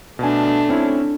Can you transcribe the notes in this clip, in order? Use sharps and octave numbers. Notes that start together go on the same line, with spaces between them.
B2 A3 D4 G#5
C4 C#4 E4